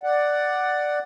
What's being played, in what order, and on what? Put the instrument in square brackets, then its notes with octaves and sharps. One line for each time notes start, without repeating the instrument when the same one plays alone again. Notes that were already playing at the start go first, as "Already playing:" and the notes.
[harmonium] D5 F#5